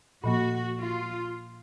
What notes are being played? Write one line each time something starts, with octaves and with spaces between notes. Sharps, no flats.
A#2 F3 A#3 F#4
F4